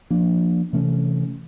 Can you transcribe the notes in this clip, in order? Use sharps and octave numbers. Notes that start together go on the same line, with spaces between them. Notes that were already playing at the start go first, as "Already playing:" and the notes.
F3 A#3 D4
C3 E3 A3 C#4